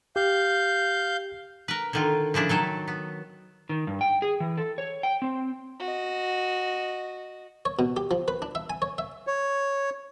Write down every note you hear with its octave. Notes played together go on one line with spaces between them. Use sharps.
G4 F5 G6
A#4 B4
D3 D#3 F4
C#3 F3 D4 E4
D#3 F#3 A4
B3
D#3
G2
G5
G#4
E3
A4
C#5
G5
C4
F#4 D#5
C#5
B2
G4
F3
B4
D4
E5
G#5
C#5
E5
C#5